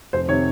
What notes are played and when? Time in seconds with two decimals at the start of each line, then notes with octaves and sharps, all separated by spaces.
0.13 F1 C5
0.28 C3 D#3 C#5